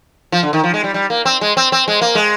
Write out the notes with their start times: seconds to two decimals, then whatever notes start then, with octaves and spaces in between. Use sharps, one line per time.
0.32 F3
0.43 D3
0.53 D#3
0.64 F3
0.74 G#3
0.84 G3
0.94 G3
1.10 A#3
1.25 C4
1.41 G#3
1.57 C4
1.72 C4
1.88 G#3
2.01 A#3
2.15 G#3